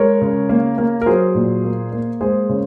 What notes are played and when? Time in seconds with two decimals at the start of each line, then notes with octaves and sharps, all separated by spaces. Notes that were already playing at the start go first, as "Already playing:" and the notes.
Already playing: G#3 A#4 C#5
0.21 C#3
0.49 A#3
0.78 A#3
1.02 A#4
1.06 F#3 G#4 C5
1.35 A#2
1.64 A#3
1.92 A#3
2.21 G#3 G#4 C5
2.49 C#3